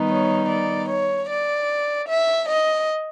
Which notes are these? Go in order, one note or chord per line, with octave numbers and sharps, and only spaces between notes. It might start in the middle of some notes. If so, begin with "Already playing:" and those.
Already playing: D#3 G3 B3 D#4
C#5
D5
C#5
D5
E5
D#5